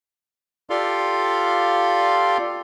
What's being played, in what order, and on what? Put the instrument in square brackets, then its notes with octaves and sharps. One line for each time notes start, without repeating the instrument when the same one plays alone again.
[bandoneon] F4 G4 A4 D5 F5 C6